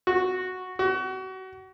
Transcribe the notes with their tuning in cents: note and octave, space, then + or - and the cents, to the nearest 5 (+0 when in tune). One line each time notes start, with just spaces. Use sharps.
F#4 -5
F#4 +30